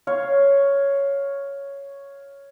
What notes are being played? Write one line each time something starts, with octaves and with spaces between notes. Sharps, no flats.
C#5 F5